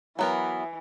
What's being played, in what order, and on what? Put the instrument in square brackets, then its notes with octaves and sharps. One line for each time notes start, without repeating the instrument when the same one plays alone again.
[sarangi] E3 [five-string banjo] F#3 B3 A#4